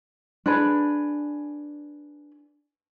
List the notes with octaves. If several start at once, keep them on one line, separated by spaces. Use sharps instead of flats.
D4 G#4 B4